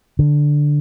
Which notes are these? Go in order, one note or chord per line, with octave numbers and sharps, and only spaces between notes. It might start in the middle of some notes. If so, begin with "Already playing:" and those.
D3